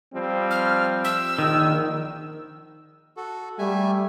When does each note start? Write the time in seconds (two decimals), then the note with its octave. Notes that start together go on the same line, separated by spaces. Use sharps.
0.13 F3 G3 C4
0.51 F6
1.04 E6
1.39 A#1 D#3
3.17 F#4 A4
3.59 G3 A3 E5 G#5